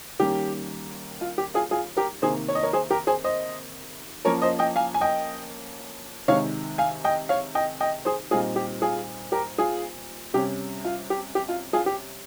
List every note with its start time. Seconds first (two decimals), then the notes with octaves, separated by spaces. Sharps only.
0.19 D#3 G3 A#3 C#4 G4
1.21 F4
1.38 G4
1.54 F4 G#4
1.71 F4 G#4
1.97 G4 A#4
2.22 C3 D#3 A#3 G#4 C5
2.48 C#5
2.55 D#5
2.63 A#4 C#5
2.73 G#4 C5
2.90 G4 A#4
3.07 G#4 C5
3.24 C5 D#5
4.25 F3 A#3 C#4 A#4 C#5
4.42 C5 D#5
4.59 D#5 G5
4.76 F5 G#5
4.94 G#5
5.01 D#5 G5
6.28 C3 D#3 G#3 C#5 F5
6.78 F5 G#5
7.04 D#5 G5
7.29 C#5 F5
7.55 D#5 G5
7.80 D#5 G5
8.05 G#4 C5
8.31 A#2 G3 C4 D#4 F4 G#4
8.56 G4
8.82 F4 G#4
9.32 G4 A#4
9.58 F4 G#4
10.34 C3 G3 C#4 G4
10.85 F4
11.10 G4
11.35 G4
11.49 F4
11.73 F4 G#4
11.86 G4